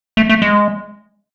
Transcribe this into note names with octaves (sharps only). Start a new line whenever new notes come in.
A3
A3
G#3